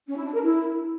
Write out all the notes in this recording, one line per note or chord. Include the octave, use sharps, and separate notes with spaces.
C#4
E4
D4
A#4
E4